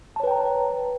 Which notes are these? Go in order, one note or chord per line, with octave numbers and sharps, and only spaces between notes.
B4 C#5 G5 A5 A#5